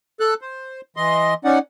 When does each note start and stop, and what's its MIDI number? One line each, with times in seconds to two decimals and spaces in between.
0.20 0.34 69
0.20 0.34 90
0.41 0.81 72
0.96 1.34 52
0.96 1.34 75
0.96 1.34 84
1.45 1.59 61
1.45 1.59 63
1.45 1.59 74
1.45 1.59 78